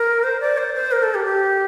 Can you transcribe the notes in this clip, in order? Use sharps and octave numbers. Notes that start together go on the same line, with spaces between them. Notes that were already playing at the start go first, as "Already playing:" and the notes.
Already playing: A#4
C5
D5
C5
C5
A#4
A4
G4
G4